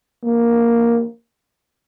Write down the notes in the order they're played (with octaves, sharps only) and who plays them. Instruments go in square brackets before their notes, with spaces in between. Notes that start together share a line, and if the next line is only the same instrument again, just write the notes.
[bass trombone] A#3